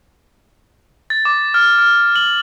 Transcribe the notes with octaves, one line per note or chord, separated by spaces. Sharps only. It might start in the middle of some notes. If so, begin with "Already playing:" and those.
A6
D6
F6
F6
F#7